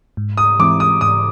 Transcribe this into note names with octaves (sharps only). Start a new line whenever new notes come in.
G#2
D#6
E3 G#3 C4 E4 D6
D#6
G#2 D#6